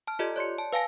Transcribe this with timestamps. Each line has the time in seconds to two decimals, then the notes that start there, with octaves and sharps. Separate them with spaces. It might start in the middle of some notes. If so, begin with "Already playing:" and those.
0.07 A5 F6
0.19 F4 G4 A4 D5 D#5
0.36 C#5 D5 C6 C#7
0.58 A5
0.73 B4 F5 G#5 A5 A#6